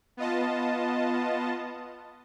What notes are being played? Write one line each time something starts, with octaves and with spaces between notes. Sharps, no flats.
B3 F4 D#5 A5